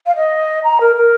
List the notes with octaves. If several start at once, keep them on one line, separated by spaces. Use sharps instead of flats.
F5
D#5
A#5
A#4
A#4